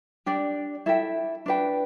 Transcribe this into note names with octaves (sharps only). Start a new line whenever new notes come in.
D4 G4 D5 G5
E4 A4 E5 G5
D4 B4 G5